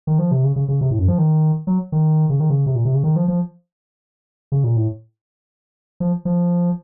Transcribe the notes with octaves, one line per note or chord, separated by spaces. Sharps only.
D#3
F3
C3
C#3
C#3
C#3
C3
A2
F#2
F3
D#3
F#3
D#3
C#3
D#3
C#3
C3
A#2
C3
C#3
D#3
F3
F3
C#3
A#2
A2
F3
F3